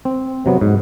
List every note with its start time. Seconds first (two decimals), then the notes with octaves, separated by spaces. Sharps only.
0.05 C4
0.46 C3 F#3 B3
0.61 G#2